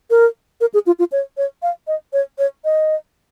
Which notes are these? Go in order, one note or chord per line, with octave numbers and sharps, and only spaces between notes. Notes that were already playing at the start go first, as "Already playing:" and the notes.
A#4
A#4
G#4
F4
F4
C#5
C#5
F5
D#5
C#5
C#5
D#5